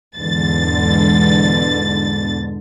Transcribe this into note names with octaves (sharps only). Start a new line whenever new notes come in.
E2 G#2 B2 D3 A6